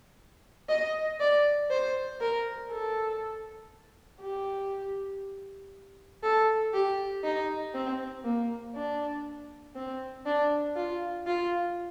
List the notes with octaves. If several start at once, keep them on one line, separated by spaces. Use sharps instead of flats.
D#5
D5
C5
A#4
A4
G4
A4
G4
D#4
C4
A#3
D4
C4
D4
F4
F4